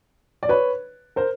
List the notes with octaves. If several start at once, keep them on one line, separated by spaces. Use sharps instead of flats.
D5
B4 C#5
A#4 C5